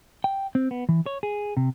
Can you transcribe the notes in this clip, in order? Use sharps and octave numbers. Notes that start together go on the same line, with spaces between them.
G5
C4
B3
E3
C#5
G#4
C3